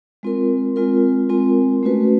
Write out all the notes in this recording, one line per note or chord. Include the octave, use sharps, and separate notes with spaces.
G#3 C4 F4 A#4
G#3 C4 F4 A#4
G#3 C4 F4 A#4
A3 C#4 F#4 B4